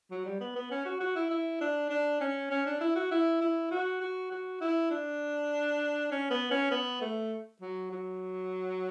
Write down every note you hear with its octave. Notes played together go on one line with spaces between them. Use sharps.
F#3
G3
B3
B3
C#4
F#4
F#4
E4
E4
D4
D4
C#4
C#4
D4
E4
F#4
E4
E4
F#4
F#4
F#4
E4
D4
C#4
B3
C#4
B3
A3
F#3
F#3